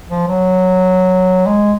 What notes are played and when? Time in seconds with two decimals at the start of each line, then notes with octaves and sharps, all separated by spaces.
0.10 F3
0.28 F#3
1.46 G#3